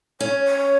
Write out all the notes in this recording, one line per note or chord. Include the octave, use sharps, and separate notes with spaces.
C#4 C#5
C#5